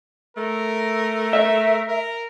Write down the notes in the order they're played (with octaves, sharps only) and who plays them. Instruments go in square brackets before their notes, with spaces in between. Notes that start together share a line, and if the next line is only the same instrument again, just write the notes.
[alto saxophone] A3 [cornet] A#4
[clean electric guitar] E5
[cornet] A#4